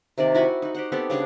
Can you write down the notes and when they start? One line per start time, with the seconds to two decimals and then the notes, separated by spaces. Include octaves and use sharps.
0.18 C3 D#3 A#3 D5
0.34 E4 F#4 G#5 B5
0.62 D#4 F#4
0.75 G4 C5 F#5
0.92 B3 C4 G4 A4
1.10 C#3 G3 D4 G#4